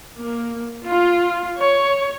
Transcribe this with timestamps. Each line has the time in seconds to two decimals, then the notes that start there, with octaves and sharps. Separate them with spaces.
0.18 A#3
0.86 F4
1.58 C#5